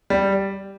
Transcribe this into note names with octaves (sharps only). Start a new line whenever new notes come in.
G3